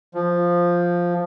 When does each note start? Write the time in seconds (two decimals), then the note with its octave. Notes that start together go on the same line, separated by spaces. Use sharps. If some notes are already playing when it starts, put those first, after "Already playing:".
0.14 F3